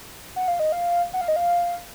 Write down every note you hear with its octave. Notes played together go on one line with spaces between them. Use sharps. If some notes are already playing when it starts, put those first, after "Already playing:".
F#5
F5
D#5
F5
F#5
F5
D#5
F5